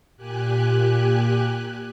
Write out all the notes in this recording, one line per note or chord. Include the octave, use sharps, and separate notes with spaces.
A#2 G4 G#5 F#6